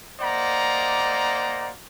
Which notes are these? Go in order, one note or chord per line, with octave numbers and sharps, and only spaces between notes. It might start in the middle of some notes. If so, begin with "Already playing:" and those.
A#3 C5 D5 D#5 F#5 A#5